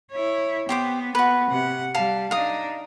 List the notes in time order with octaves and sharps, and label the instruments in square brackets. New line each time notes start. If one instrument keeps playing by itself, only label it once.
[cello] E4 C#5
[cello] B3 [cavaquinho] G4 C5 D6
[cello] B3 [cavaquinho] F#4 B4
[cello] C3 F#5
[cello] G3 [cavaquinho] F5 A5
[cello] D4 D#4 [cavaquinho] F5 D#6